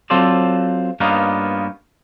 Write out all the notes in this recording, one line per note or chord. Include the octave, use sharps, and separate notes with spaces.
F#3 C4 F4 A4 C5 D5
G2 A#3 B3 C#4 D#4 F4